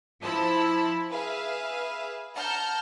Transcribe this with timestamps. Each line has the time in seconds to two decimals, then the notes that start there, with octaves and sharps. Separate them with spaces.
0.21 F3 E4 C5 A5 B5
1.11 G#4 B4 E5 F5
2.35 F#5 A5 A#5 F6 G6